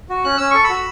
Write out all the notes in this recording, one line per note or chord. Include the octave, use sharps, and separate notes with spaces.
F#4
C#4 F#6
C#4 E6
A4 C#6
B5 E6
F#4